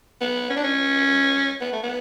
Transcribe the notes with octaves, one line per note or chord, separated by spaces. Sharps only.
B3
C#4
D4
C#4
B3
A3
B3